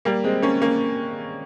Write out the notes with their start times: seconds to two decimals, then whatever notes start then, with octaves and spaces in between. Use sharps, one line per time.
0.05 G3 A#3
0.24 G#3 C4
0.42 A#3 C#4
0.62 A#3 C#4